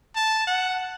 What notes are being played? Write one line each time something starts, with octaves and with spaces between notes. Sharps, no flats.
A5
F#5